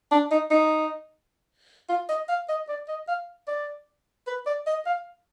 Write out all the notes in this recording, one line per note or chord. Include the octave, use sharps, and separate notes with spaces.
D4
D#4
D#4
F4
D#5
F5
D#5
D5
D#5
F5
D5
B4
D5
D#5
F5